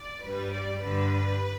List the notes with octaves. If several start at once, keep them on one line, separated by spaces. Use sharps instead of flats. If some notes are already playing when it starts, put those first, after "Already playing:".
Already playing: D5
G2 G3 B4
D5
G2 D3 G3 B4